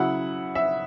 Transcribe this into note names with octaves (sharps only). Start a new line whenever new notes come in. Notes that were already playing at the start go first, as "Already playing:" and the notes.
Already playing: C#3 F#3 E4 F#5
E5